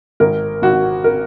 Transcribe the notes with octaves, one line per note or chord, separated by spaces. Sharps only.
G#1 A#4
G#1 F#4
A#4